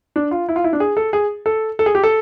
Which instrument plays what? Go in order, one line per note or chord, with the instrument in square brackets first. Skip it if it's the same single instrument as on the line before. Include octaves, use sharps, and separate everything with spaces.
[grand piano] D4
F4
E4
F4
E4
D4
G#4
A4
G#4
A4
A4
G#4
G4
A4